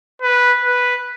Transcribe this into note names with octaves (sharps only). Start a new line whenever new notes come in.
B4
B4